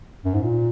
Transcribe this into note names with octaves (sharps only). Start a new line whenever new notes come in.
F#2
G#2
A#2